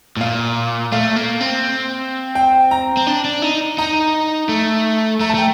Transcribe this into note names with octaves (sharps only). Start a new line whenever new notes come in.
A2
A#2 F5
A3 F5
A#3
C4
G5
A#5
C4
D4
D4
D#4
D#4 A#5
A3
A3 A#5
A5
A3 G5